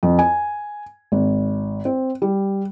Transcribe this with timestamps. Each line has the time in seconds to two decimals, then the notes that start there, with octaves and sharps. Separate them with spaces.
0.03 F2
0.19 G#5
1.12 G#1
1.85 C4
2.22 G3